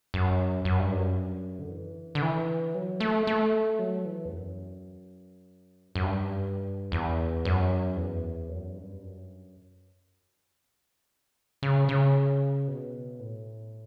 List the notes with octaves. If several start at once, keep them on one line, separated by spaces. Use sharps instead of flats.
F#2
F#2
G2
F#2
D3
E3
D3
E3
F#3
A3
A3
F#3
E3
E2
F#2
G2
F#2
G2
E2
F#2
E2
F#2
G2
F#2
C#3
C#3
B2
A2